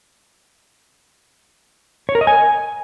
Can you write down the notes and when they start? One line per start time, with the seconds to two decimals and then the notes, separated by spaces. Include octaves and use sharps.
2.09 C#5
2.15 A#4
2.21 D#5
2.27 G#5